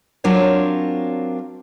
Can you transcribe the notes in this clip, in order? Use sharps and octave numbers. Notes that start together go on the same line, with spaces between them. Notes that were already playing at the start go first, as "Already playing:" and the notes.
F#3 C4 D4 F4 A#4 C#5